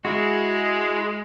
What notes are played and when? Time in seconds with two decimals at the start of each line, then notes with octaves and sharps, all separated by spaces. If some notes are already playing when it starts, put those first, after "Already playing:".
0.05 G#3 E4 F#4